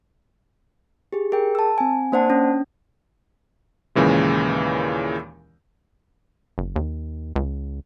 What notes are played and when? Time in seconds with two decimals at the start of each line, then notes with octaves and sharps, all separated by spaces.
1.13 G4 G#4
1.32 G#4 A#4 G5
1.55 A5 E6
1.78 C4 G#5
2.12 A#3 D4 C5 D5 F#5 A5
2.30 C#4 D4
3.95 D#2 A#2 C#3 E3 G#3
6.58 F#1
6.76 D#2
7.36 C#2